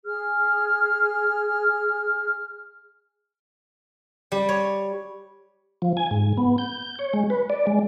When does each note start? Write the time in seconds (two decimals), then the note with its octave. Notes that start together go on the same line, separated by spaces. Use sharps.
0.06 G#4 F6
4.32 G3
4.49 C#5
5.82 F3
5.97 G#5
6.11 G#2
6.37 B3
6.58 G6
6.99 C#5
7.13 G#3
7.30 B4
7.50 D5
7.67 G#3